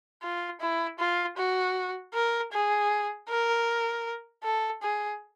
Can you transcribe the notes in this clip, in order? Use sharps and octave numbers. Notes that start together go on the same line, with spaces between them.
F4
E4
F4
F#4
A#4
G#4
A#4
A4
G#4